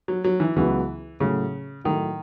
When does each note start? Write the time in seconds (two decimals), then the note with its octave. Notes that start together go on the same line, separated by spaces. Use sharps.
0.08 F#3
0.24 F#3
0.40 E3
0.56 C#2 C#3 E3 F#3 B3 F#4
1.20 A2 C#3 F#3 A3 E4
1.84 A2 D#3 F#3 A3 E4